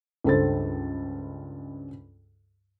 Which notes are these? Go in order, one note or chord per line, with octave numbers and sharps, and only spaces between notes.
C#2 G2 A4 C5 A6